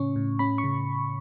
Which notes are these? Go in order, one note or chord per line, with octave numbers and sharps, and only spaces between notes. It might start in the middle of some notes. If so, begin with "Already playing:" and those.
Already playing: A2 C#3 C#4 C#6
A2
C#4 B5
C#6
C#3